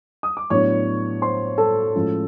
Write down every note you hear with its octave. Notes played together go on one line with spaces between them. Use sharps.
D#6
D6
A2 F#3 B3 D4 C#5 C#6
C5 C6
A4 A5
A2 F3 G#3 C#4